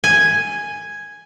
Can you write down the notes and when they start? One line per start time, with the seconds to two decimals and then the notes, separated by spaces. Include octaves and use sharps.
0.04 G#5